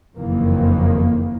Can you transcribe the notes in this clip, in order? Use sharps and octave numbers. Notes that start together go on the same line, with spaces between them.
F#1 F2 D#3 E3 A#3